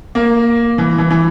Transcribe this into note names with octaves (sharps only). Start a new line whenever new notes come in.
A#3
E3
E3
E3